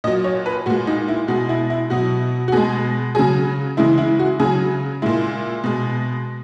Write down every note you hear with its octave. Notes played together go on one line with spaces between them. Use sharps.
A#2 F#3 D#5
C#5
B4
A#2 G#3 F#4
D#4
E4
B2 G#3 F#4
E4
E4
B2 F#3 F#4
F#4
B2 G#3 G#4
C#3 F#3 G#4
C#3 E3 G#3 E4
E4
F#4
C#3 F#3 G#4
A#2 G#3 E4
B2 G#3